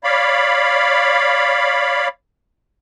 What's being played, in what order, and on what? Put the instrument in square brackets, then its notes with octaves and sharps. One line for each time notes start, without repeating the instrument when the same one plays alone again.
[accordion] C#5 D5 F5 B5